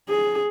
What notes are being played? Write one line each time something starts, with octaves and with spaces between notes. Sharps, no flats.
G#4